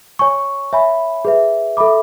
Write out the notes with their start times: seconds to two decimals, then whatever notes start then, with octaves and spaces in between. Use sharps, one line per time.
0.19 C#5 G#5 C#6
0.73 C#5 E5 G#5 B5
1.25 G#4 B4 E5
1.77 A4 E5 B5 D6